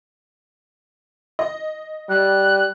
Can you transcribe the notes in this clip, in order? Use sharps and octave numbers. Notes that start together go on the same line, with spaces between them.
D#5
G3 F#6